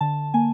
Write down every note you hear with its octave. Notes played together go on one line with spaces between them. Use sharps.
D3 A5
A#3 G#5